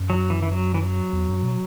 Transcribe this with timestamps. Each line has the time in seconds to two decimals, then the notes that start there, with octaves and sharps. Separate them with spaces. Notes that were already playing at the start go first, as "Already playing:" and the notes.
Already playing: F#2
0.10 F#3
0.30 E3
0.42 E3
0.52 F#3
0.74 E3
0.82 F#3
1.13 E2
1.28 F#2
1.43 B2